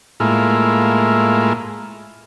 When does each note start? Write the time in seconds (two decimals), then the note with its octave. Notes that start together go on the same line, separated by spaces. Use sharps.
0.20 A2 G#3 A#3 E4 F4